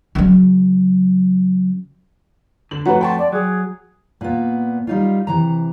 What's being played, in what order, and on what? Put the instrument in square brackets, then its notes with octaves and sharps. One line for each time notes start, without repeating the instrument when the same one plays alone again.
[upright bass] C#3 F#3
[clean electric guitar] D3 [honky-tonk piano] F#7
[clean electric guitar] F2 A3 [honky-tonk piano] F#4 B4 [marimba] C#5 F#5 A#5
[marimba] F#5 C6 C#6 [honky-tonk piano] G5 [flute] A5
[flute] D5
[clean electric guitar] F#3 [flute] G#4
[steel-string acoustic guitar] A#2 B3
G3 D#4 F4
C3 E3 A#5